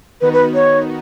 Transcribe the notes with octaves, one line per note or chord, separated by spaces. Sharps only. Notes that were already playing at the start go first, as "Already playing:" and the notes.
D#3 B3 D#4 F#4 B4
B4
C#5